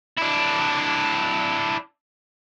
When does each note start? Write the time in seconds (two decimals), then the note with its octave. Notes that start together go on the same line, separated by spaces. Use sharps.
0.18 D4 E4